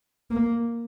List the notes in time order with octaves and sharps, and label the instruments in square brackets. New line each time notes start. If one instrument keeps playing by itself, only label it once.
[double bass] A#3